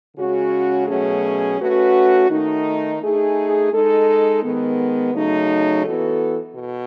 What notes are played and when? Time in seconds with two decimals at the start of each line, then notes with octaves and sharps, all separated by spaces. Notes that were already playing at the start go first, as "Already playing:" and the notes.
0.17 C#3 G#3 C#4 F#4
0.87 B2 F#3 A3 C#4 G#4
1.59 A3 C#4 F#4 B4
2.29 D#3 A3 D#4
3.01 A3 D#4 G#4
3.72 G#3 D#4 A4
4.43 D#3 G#3 B3
5.13 C#3 F#3 A3 D#4
5.85 E3 B3 F#4 A4
6.55 B2